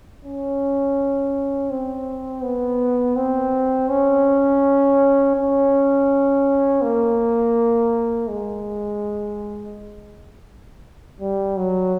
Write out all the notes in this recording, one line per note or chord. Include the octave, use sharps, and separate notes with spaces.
C#4
C4
B3
C4
C#4
C#4
A#3
G#3
G3
F#3